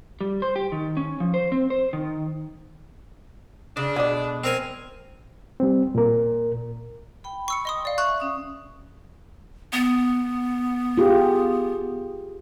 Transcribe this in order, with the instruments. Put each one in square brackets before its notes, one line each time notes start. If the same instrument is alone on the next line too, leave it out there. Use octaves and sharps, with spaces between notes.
[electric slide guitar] G3
C5
G4
D#3
C#4
F3
C5
C4
C5
D#3
[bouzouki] C#3 [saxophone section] D4
[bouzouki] B2 G#3 [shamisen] D3 D5
[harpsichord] C4 A#4 G#5
[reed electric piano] G3 C4
A#2 A#4
[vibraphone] G5 B5
[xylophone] C#6 E6 C#7
D#5 C6 D#6
D5 F5
[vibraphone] E5 [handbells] C#6 [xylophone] F#6
[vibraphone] C#4 D#6
[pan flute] B3
[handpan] F4 G4 G#4